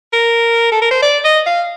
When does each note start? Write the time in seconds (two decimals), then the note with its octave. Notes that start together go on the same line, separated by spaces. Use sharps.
0.13 A#4
0.72 A4
0.82 A#4
0.91 C5
1.02 D5
1.24 D#5
1.46 F5